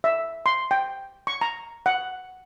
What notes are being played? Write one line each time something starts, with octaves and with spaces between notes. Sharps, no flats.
E5
C6
G5
C#6
A#5
F#5